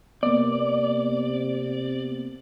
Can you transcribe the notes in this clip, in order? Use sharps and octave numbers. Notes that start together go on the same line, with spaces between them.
C3 A#3 B3 D5